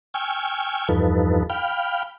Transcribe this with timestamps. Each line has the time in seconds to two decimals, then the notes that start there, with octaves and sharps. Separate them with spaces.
0.14 G5 G#5 C#6 E6 F6
0.89 E2 G2 F3 D#4 A4 B4
1.50 F5 G5 B5 F6